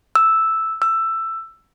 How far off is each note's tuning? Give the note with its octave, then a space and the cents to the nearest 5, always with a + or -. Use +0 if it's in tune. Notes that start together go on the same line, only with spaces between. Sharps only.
E6 -5
E6 +10